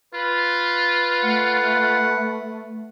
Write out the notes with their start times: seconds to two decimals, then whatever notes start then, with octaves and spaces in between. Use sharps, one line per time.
0.14 F4 B4
1.23 A3 F#5